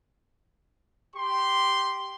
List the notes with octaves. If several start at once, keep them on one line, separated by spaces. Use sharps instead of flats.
G4 C6